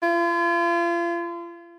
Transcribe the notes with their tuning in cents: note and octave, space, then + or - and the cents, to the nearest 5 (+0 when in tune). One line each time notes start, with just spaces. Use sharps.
F4 -40